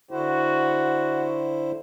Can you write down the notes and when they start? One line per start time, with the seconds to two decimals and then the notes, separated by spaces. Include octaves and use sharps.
0.11 D3 E4 F#4 C5